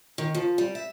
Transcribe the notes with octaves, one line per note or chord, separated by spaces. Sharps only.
D#3
F3
G3
E5